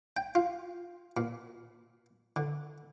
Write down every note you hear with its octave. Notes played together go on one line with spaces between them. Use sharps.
G5
F4
A#2
D3